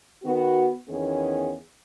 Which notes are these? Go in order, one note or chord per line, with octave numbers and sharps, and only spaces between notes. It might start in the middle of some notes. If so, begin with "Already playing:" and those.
D#3 B3 F#4
E2 D#3 B3 C#4 G#4